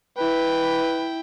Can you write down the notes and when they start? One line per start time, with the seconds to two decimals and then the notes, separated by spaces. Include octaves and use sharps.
0.18 E4 B4 G5